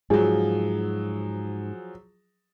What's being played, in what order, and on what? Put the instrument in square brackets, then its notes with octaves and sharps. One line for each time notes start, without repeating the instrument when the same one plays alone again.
[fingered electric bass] G#2 [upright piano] F3 F#3 [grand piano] G#4